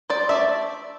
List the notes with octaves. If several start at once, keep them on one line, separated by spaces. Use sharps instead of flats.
C5 D5
A3 D4 D5 E5